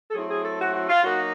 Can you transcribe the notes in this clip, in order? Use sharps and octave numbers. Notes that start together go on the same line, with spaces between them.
A4
F#3 A3 C4 E4 G#4
G#4
A4
F#4
F#4
F4
F#3 A#3 D#4 F#4